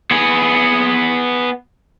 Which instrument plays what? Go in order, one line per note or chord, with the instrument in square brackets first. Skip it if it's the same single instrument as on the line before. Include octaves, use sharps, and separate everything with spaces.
[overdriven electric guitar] B3 G#4